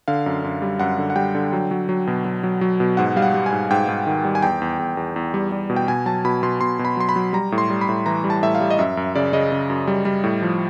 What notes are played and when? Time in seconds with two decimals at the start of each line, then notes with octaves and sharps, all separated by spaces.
0.08 D3 F5
0.26 F#2
0.44 F#2
0.62 G3
0.80 F#2 F#5
0.98 D3
1.10 F#5
1.16 G3 G5
1.35 D3
1.53 F#3
1.71 F#3
1.89 F#3
2.07 B2
2.25 F#3
2.43 F#3
2.61 F#3
2.80 B2
2.97 G#2 F#5
3.16 G3 F5
3.22 F#5
3.34 G3
3.46 G#5
3.52 G#2
3.70 G#2 G5
3.89 G#2
4.07 D#3
4.25 G3
4.35 G#5
4.43 E2 G5
4.62 E2
4.79 E2
4.97 E2
5.16 E2
5.34 G3
5.52 G3
5.70 B2
5.76 G5
5.88 B2 G#5
6.06 F#3 A5
6.25 B2 B5
6.43 B2 C6
6.61 B2 C6
6.79 B2
6.85 B5
6.97 F#3 C6
7.09 B5
7.16 F#3
7.33 G3 A#5
7.52 A2
7.58 C6
7.70 G3
7.81 B5
7.89 A2
8.06 E3 A#5
8.24 G3
8.30 A5
8.43 A2 E5
8.55 F5
8.61 G3
8.70 D#5
8.79 F#2 E5
8.97 F#2
9.15 C#3 D5
9.33 C#3 D#5
9.52 C#3
9.70 F#2
9.87 G3
10.05 G3
10.24 A2
10.42 F3